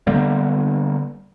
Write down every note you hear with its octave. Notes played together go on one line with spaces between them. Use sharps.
D3 G3 A#3 B3